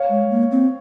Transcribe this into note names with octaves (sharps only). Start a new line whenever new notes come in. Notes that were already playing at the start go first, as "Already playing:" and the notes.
Already playing: C#5 F5
G#3
A#3
C4